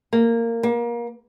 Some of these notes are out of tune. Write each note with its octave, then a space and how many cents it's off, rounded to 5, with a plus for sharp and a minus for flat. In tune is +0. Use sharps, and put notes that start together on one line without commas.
A#3 -15
A#3 +25